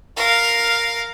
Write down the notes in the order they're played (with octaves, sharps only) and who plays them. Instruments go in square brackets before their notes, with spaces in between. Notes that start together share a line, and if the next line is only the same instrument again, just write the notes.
[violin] A#4 F5